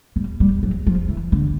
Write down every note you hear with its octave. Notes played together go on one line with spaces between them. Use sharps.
G3
G3
F#3
F3
E3
D3